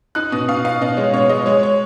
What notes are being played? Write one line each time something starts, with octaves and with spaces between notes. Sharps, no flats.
D#4 F#6
B2 D#6
B2 F5
D#4 F5
B2 D#5
G#3 C#5
B2 C#5
G#3 D#5
G#3 C#5
C#5